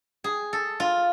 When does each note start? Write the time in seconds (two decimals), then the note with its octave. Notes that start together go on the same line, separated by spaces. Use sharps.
0.24 G#4
0.53 A4
0.80 F4